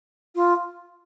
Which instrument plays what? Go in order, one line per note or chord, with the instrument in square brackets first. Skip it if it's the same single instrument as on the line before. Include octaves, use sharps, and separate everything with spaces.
[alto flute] F4